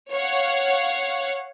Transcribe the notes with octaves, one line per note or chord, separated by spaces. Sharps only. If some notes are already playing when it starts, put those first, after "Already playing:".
C#5 F5 F#5